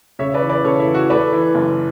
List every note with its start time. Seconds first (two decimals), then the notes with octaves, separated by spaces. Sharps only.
0.19 C#3 C#5 E5
0.34 B4 D5
0.42 E3
0.49 B4 D5
0.64 C#3 A4 C#5
0.80 E4
0.87 E3
0.94 F#4
1.10 A3 B4 D5
1.32 E3
1.55 F#1